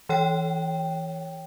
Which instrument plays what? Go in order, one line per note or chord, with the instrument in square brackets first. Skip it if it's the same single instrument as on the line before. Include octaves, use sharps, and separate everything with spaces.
[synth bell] E3 C#5 G5